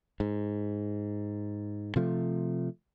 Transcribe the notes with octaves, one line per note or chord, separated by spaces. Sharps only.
G#2
C3 F3 A3